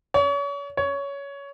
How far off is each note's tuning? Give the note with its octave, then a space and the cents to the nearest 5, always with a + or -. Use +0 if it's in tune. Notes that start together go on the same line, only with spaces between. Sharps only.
C#5 +35
C#5 +15